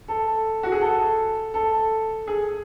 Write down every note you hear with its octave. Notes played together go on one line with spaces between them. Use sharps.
A4
F#4
G#4
A4
A4
G#4